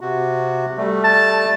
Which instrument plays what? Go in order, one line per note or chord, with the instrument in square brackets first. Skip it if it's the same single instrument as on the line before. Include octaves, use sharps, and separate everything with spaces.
[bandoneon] C3 F#4
G3 A3
[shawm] A5